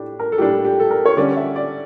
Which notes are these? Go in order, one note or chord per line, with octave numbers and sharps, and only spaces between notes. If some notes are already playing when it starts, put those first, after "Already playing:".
Already playing: A2 D4 G4
A#4
A4
A2 G3 D4 G4
G4
A4
A#4
C#5
D3 G3 C#4 D5
E5
D5